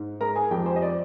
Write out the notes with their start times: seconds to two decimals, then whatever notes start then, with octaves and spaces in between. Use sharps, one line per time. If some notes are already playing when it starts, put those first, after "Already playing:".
Already playing: G#2
0.21 G#3 A#4 A#5
0.36 G#4 G#5
0.51 F2 G4 G5
0.66 C5
0.76 D#5
0.82 D5